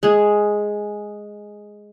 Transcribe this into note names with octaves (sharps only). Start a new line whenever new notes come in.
G#3 G#4